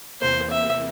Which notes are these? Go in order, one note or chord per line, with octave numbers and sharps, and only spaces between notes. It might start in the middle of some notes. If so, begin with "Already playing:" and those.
E2 C3 E3 A#3 C5
E5